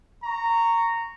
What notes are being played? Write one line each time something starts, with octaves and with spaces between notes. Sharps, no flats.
A#5 C#6